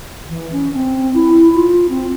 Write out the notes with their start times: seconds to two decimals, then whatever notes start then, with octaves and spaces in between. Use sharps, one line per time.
0.29 E3
0.52 C#4
0.74 C4
1.14 E4
1.55 F4
1.89 C4